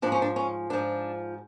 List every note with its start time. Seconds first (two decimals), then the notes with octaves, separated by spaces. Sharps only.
0.02 G#2 F3 D4
0.12 C#4
0.22 D4
0.36 C#4
0.70 G#2 F3 D4